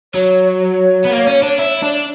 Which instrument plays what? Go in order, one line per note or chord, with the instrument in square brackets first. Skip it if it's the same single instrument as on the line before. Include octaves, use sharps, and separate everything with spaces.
[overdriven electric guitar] F#3 [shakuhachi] C#5
[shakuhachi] C#5
[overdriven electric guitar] B3
A#3
C#4
D4
E4
D4